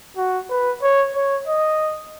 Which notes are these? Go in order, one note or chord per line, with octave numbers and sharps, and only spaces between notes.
F#4
B4
C#5
C#5
D#5